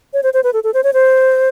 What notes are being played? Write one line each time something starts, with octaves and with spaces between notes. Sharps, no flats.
C#5
C5
C5
B4
A4
A4
C5
C#5
C5